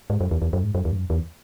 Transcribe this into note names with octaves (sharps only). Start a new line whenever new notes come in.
G#2
F#2
E2
E2
F#2
G#2
F#2
E2
G#2
F#2
E2